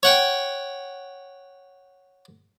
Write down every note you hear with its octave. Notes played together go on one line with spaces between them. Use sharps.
C#5 F#5 G5